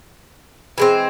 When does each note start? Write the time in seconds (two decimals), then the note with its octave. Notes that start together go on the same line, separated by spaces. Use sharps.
0.78 E3 G#3 C4